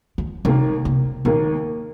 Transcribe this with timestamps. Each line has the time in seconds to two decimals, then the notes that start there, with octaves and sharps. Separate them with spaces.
0.18 D#3
0.45 D#2 C3 D#3 A#3
0.85 C3
1.25 D#2 A#2 D#3 A#3